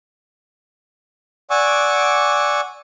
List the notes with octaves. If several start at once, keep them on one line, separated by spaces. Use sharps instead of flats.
D5 F#5 G#5 C#6 D6 E6